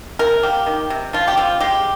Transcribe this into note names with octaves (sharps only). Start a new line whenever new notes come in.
C3 A#4
A#3 G4
D#3
C3
F3 F4
G4
C4 F4
G#3 G4